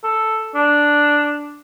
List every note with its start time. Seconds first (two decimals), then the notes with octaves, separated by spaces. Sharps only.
0.04 A4
0.55 D4